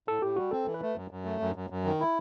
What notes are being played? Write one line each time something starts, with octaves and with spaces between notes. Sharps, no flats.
A2 A4
A2 G4
G3 F#4
C4 A4
E3
B4
A3
F#2
F#2
A3
F#2
F#2
F#2
D#3
E4